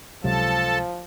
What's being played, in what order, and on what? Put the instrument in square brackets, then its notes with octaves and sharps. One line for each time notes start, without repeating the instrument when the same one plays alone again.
[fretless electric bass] C#2 C3 F#3 [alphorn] F3 [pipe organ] A4 A5